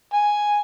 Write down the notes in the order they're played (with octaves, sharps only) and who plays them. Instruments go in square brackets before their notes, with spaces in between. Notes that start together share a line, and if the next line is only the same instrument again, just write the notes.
[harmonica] G#5